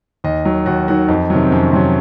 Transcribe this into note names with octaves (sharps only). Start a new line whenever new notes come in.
D#2 D#5
D#3 F#3
D#2 F#4
D#3 F#3 F#4
F2 D#4
C3 D#3 F#3
C4
F2 C#4
C3 D#3 F#3